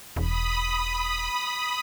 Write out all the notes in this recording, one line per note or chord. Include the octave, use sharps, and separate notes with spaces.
E1 B5 D#6